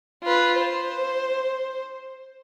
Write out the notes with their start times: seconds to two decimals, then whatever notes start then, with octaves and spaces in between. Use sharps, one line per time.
0.23 F4 B4
0.57 C5